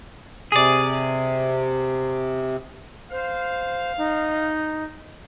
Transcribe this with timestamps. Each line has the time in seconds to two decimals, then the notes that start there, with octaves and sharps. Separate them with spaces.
0.52 C3 G#4 D5
3.11 C5 F5
3.97 D#4